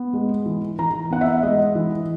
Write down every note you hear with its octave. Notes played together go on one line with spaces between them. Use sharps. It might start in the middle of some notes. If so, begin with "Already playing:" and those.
Already playing: B3
G#3
E3
E3 A#5
B3 F#5
E5
G#3 D#5
E3